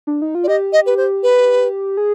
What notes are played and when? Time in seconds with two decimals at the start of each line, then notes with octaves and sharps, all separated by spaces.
0.07 D4
0.22 D#4
0.35 F4
0.44 D5
0.48 G4 D#5
0.73 D#5
0.86 B4
0.97 C5
1.23 B4
1.97 G#4